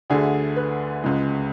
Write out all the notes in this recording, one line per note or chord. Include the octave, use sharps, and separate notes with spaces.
D2 D3 A3 G#4
B4
C#2 C#3 G#3